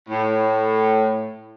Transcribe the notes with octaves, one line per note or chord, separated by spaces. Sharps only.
A2